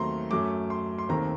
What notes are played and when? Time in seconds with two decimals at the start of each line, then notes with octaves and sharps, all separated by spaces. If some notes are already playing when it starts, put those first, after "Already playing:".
Already playing: D#2 D#3 F#3 A3 C4 A#5 C6
0.31 F#2 F#3 A3 D6
0.70 C6
0.98 C6
1.09 D#2 D#3 A3 C4 A#5